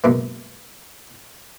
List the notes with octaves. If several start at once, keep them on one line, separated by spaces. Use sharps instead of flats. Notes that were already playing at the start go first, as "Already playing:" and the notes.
C#2 F#2 B2 A#3